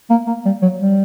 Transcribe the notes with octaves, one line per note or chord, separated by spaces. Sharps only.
A#3
A#3
G3
F#3
G3